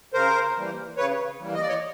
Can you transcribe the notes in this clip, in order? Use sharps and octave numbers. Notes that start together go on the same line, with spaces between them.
C#3 A#4 C5
E3 G3 A#3
C#3 B4 C#5
E3 G3 A#3
D#5
D5
C#5 D#5